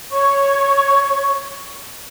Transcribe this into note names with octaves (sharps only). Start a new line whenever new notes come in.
C#5 C#6